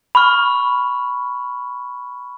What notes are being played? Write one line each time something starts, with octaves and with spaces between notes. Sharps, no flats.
B5 C#6 F6